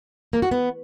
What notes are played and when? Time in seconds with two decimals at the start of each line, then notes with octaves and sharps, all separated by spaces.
0.33 A#3
0.42 F#4
0.51 B3